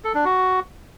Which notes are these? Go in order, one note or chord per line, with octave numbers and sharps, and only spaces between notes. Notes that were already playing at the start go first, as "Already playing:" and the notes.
A4
D4
F#4